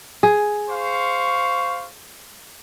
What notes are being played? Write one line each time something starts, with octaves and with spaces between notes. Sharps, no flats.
G#4
C5 F5 C#6